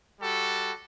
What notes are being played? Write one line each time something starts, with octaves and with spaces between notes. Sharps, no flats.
G3 F#4 A4